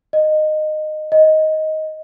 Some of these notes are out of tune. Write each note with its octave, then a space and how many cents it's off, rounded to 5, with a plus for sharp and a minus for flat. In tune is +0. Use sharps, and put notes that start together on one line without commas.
D#5 -15
D#5 +10